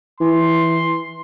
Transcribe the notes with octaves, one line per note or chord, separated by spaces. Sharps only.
E3 C6